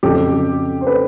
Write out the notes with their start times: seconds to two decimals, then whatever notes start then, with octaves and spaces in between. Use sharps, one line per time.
0.03 F2 C#3 F#3 G4 A4
0.81 C5
0.87 A4 B4